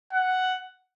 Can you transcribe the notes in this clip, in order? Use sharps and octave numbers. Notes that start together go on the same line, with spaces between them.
F#5